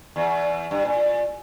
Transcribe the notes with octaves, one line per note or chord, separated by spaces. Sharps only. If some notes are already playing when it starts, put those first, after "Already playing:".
E2
G2
A#2